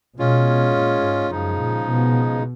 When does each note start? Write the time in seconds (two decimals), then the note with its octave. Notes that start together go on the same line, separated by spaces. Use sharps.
0.19 B2 G#3 C#4 F4
0.75 A#2
1.03 G#2
1.31 F#2 C#3 F3 G#3 D#4
1.59 A#2
1.87 B2